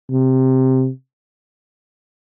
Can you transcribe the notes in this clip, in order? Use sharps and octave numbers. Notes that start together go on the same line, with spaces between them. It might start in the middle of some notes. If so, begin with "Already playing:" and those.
C3